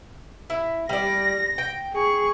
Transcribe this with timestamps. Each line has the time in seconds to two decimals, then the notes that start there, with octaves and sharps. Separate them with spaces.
0.50 E4
0.89 G3 D5 A#6
1.58 G5
1.94 G#4 C#6